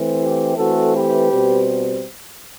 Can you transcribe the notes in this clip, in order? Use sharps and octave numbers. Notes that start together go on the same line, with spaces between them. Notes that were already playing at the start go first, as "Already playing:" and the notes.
Already playing: E3 A3 C4
E4 G4
E3 A3 C4 F#4 A4
G4 B4
B2 G3 C4